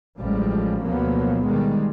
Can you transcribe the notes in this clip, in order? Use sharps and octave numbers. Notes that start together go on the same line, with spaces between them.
A1 F3 G3 G#3
D2 B2 F3 F#3 A#3 B3
B2 D#3 G3 G#3